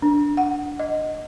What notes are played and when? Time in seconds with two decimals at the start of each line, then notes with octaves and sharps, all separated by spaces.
0.02 D4
0.37 F#5
0.79 D#5